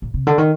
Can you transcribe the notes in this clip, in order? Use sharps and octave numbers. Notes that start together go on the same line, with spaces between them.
A#2
C3
D3
D#3